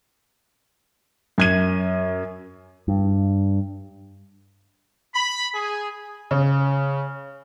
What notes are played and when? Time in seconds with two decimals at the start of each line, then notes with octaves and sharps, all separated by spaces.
1.38 F#2 G#6 D#7
2.88 G2
5.15 B5
5.55 G#4
6.31 C#3